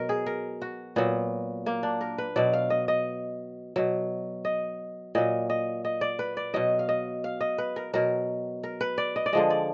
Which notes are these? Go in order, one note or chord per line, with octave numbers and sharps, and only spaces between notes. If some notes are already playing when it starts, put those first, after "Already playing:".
Already playing: B2 F#3 A#4
G#4
A#4
F#4
A#2 F#3 B3
A#3
D4
A#4
B4
B2 F#3 D5
F5
D#5
D#5
B2 F#3
D#5
A#2 F#3 D#5
D#5
D#5
D5
B4
D5
B2 F#3 D#5
F5
D#5
F5
D#5
B4
A#4
B2 F#3 A#4
A#4
B4
D5
D#5
D5
D3 F3 G#3 D#5
D5